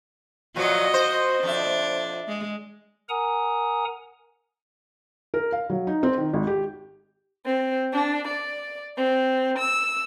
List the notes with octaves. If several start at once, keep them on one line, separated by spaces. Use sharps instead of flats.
A#2 F3 F#3 F#4 D#5
C5
F2 D4 E5
G#3
A#4 F#5 G#5 A#5 D#6
A#4
F5
F#3
D#4
C4
D#3
G#1
G4
C4
D4
D5
C4
E6